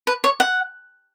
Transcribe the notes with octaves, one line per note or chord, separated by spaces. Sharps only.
B4
C#5
F#5